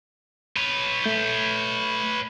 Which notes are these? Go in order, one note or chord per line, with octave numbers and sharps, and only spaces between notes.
B4 C#5
A3 G6